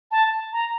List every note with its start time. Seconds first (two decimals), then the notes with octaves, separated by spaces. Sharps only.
0.11 A5
0.53 A#5